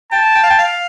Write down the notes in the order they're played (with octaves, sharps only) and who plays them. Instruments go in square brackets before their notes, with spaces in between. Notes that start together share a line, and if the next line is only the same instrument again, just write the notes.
[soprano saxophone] G5 [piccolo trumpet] A5
[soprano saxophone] G5
F5
G5
F5